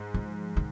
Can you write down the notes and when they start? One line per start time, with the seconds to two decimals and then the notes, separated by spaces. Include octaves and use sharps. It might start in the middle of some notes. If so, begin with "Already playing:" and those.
Already playing: G#2
0.14 F3
0.57 D#3